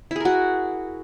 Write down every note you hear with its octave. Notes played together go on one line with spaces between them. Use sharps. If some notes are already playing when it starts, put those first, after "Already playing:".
E4 F#4 G#4 A#4